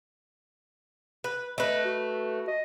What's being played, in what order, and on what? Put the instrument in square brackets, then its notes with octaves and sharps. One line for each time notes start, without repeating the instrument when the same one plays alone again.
[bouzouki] B4
[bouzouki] A3 B4 [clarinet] D#5
[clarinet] F#4
D#5